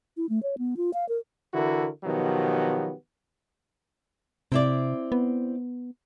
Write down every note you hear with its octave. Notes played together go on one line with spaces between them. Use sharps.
E4
A3
C#5
B3
F4
F5
A#4
D3 E3 E4 F#4 A#4
B2 D#3 F3 F#3 B3 G4
C3 C4 E4 D5
B3